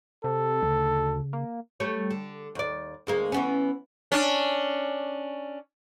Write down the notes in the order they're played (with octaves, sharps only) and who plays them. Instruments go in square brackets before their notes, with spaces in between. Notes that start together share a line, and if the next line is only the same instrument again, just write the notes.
[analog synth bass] C3 [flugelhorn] A4
[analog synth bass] D2 [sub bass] C#3
[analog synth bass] A#3
[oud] G3 A3 C#5
D3
D#2 D5
D2 G#3 A#3
E3 B3 C#4
[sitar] C#4 D4